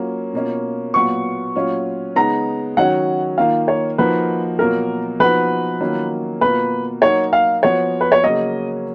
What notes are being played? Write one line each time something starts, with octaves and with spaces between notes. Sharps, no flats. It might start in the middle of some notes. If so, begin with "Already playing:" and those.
Already playing: F#3 A#3 C#4 F4
B2 A#3 C#4 F4
A#2 F#3 B3 F4 C#6
A#2 F#3 C#4 F4
C#3 G#3 B3 D#4 A#5
D#3 F#3 C#4 F#4 F#5
D#3 A#3 F4 F5
C#5
F3 A#3 D#4 F#4 B4
B2 F#3 A#3 F4 A#4
F3 B3 D#4 F#4 B4
D#3 F#3 A#3 C#4 F4
B2 A#3 F4 B4
F#3 A#3 D#4 F#4 C#5
F5
F3 B3 F#4 C#5
B4
C#5
C#3 F#3 A#3 C#4 D#5